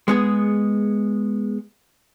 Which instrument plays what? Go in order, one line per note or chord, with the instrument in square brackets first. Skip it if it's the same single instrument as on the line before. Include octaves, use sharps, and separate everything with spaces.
[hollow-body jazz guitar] G#3 B3 G#4